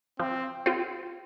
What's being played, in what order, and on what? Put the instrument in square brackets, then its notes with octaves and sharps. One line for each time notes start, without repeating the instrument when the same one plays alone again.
[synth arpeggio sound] F3 [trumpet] C4
[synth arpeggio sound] C4 F4